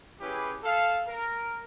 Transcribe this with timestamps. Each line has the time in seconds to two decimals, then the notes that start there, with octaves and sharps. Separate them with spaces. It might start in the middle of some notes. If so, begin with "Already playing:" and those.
0.21 C#4 E4 G4 G#4 B4
0.64 A4 F5
1.08 A#4